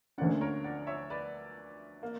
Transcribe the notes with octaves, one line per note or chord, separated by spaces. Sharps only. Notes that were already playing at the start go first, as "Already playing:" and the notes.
D2 D3 A#3 C#4 D5 F#5
A#4 C#5
D5 F#5
C#5 E5
B4 D5
A#3